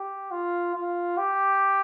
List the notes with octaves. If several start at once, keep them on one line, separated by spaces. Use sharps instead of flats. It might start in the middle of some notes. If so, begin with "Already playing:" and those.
Already playing: G4
F4
F4
G4